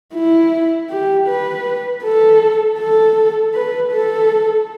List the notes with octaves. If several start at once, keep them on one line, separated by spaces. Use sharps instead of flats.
E4
G4
B4
A4
A4
B4
A4